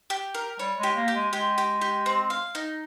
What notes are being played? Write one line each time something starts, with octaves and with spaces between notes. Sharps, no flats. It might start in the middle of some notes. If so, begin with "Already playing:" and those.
G4
A#4
G3 C#5
G#3
G4
A#3
G4
G#3
G#3 G4
G4
G4
C4
F5
D#4